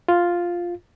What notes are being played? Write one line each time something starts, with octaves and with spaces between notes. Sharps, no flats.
F4